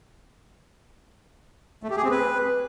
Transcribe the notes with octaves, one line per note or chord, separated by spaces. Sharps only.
A3
G4
G#4
C4
B4